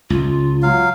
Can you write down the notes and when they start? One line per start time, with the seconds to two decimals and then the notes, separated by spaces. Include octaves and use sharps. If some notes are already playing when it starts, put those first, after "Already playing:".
0.10 C#2 F4
0.63 F#3 F5